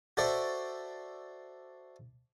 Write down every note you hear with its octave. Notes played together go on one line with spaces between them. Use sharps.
F#4 A4 C5 D5 E5 C#6